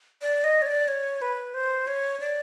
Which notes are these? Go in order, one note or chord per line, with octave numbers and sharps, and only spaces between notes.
D5
D#5
C#5
D5
C#5
B4
C5
C#5
D5